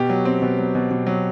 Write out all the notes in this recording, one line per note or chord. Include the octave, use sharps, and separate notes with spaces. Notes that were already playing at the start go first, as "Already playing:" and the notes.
Already playing: B2 G4
F#3
C4
B2
F#3
B2
B2
F#3